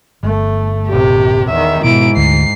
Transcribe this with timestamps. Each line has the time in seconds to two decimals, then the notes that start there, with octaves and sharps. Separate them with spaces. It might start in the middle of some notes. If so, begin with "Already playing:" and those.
0.23 G1 A3
0.88 A#1 C3 G4
1.49 E2 D#3 E5
1.84 G#2 B2 E4 D7
2.17 D2 C7